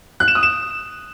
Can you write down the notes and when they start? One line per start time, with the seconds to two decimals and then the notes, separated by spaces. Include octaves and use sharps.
0.20 F#6
0.28 E7
0.35 D#6
0.43 E7